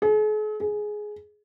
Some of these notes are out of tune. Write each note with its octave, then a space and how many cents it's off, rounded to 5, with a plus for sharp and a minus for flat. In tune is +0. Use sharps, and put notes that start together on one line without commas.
G#4 +45
G#4 +10